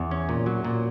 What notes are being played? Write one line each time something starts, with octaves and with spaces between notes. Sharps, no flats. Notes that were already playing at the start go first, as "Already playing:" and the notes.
Already playing: E2
C#4
A#2
F#3
A#2